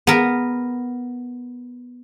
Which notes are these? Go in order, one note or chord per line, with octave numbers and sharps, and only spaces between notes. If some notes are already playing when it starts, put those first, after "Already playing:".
B3 A#4